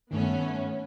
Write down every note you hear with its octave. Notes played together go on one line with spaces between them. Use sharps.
G2 D#3 A3 B3 C#4